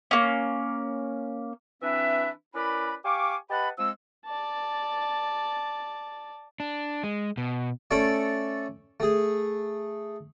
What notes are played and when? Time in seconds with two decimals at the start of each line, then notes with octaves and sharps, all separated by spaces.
0.11 A#3 C#4
1.83 E3 C4 D4 B4 E5
2.55 C#4 E4 A#4 B4 D5 B5
3.05 G4 F5 G#5 C#6 D6
3.50 G4 B4 D#5 F#5 A5 B5
3.78 F3 G#3 C4 E6
4.25 D5 A5
6.60 D4
7.04 G#3
7.37 B2
7.91 A3 C#4 A4 C#5 D5
9.00 A3 G#4